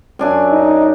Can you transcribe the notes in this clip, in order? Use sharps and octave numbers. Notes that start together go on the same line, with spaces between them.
F#2 D4 G#5
D#4